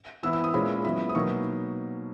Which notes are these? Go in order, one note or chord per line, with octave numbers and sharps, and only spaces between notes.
E3 B3 E4 E6
E6
D#6
A#2 G#3 C#4 E4 B5
F#3 B3 E4 B5
D#6
B2 F#3 A#3 D#4 C#6